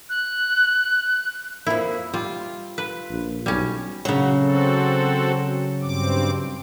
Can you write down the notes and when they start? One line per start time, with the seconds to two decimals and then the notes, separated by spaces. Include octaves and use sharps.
0.09 F#6
1.67 F2 A#3 E4
2.14 G3 F4
2.78 B4
3.10 A#1
3.46 B1 G3 C#4
4.05 C#3 F#3 F#4
4.37 C4 F#4 A4
5.82 G2 C4 D6